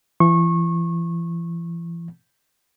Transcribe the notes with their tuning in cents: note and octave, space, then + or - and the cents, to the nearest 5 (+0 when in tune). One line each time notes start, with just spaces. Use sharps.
E3 +40 C#6 -25